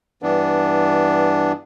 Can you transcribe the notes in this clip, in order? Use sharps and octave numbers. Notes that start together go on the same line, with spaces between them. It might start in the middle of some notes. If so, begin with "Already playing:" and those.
G2 E3 B3 D4